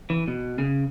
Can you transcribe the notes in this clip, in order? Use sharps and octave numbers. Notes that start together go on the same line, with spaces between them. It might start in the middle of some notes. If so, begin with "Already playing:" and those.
E3
B2
C#3